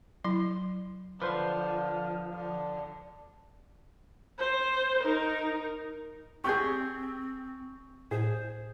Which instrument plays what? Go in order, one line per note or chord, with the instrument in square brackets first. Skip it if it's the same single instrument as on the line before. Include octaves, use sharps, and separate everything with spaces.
[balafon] F#3 E4 [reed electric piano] C6
[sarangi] D3 [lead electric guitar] F3 [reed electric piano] B4 C5 C6
[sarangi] D3
[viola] C5
D#4 A#4
[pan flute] C4 [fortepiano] G4 G#4 [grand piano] C#6 G6
[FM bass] A2 [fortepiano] G#4 [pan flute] C5